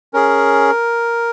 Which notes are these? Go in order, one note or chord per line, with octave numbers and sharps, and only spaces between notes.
C#4 G#4 A#4